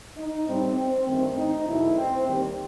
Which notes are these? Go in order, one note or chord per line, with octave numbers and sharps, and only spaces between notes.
D#4
A2 G3 C4
C4
G2 D#3 A3 C4
D#4
E2 B2 F#3 A3 E4
C4
D#2 D#3 G3